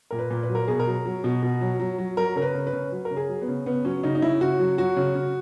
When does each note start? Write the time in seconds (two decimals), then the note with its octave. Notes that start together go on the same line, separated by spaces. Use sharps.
0.11 A#2 A#4
0.19 B4
0.30 A#2
0.43 B4
0.49 F#3
0.55 A#4
0.68 B2 G#4
0.80 A#4
0.87 F#3
1.05 F#3
1.24 B2
1.43 B2
1.61 F#3
1.80 F#3
1.98 F#3
2.17 F#3 A#4
2.36 C#3 A#4
2.42 B4
2.55 C#3
2.67 B4
2.73 C#3
2.92 F#3
3.05 A#4
3.11 C#3
3.17 G#4
3.29 F#3
3.41 B3
3.48 C#3
3.66 C#3 B3
3.85 F#3 C#4
4.03 C#3 D#4
4.15 D#4
4.22 C#3 E4
4.41 C#3 F#4
4.59 F#3
4.78 F#3 F#4
4.96 C#3
5.15 C#3